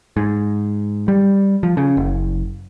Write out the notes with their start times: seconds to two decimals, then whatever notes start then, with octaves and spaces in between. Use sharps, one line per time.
0.17 G#2
1.08 G3
1.63 F3
1.77 C#3
1.97 F#1